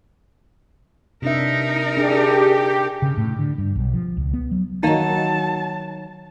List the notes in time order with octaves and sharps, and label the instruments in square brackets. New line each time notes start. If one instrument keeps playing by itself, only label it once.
[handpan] C3 D4 E5 [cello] D#4 A#4
[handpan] D4 [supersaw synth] G4 [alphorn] G#4
[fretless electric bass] C#3
A2
D3
G2
B1
F3
C#2
B3
F#3
[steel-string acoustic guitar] D#3 F#3 [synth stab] A#3 D#4 [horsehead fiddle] A5